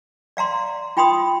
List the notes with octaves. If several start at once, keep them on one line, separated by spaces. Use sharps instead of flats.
D5 F5 A#5 C6
F4 G5 B5 C6 D#6